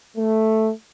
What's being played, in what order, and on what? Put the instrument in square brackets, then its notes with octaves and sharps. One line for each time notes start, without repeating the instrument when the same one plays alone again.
[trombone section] A3